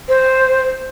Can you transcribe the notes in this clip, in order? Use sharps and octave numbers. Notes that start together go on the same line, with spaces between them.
C5